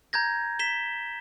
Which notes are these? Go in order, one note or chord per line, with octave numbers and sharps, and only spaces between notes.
A#5 G6 G#6 A#6
B6 E7 G7